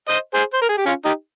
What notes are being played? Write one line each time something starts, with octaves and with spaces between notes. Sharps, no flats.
C5 D#5
G#4 C5
C5
A#4
G#4
G4
C#4 F4
D#4 G4